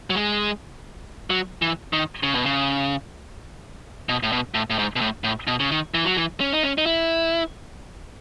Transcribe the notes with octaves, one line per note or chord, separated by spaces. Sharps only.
F#3
G#3
F#3
E3
D#3
C#3
B2
C#3
B2
A2
B2
A2
A2
G#2
B2
A2
A2
B2
C#3
D#3
E3
F#3
E3
C#4
D#4
C#4
D#4
E4